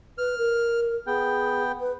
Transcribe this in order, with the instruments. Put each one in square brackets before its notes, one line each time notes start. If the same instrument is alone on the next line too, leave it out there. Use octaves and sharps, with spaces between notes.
[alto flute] B4 [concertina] F6
[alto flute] A#4
[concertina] B3 G5 [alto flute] G#4
[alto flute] B4